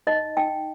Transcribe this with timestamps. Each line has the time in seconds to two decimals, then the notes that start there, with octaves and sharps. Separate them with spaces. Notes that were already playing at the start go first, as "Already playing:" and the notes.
0.07 D#4 D#5
0.37 D#4 G5